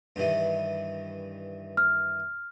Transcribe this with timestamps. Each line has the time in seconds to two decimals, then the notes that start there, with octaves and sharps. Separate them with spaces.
0.16 G2 D#3 E3
1.77 F6